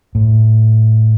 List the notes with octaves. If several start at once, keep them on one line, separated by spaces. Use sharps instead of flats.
A2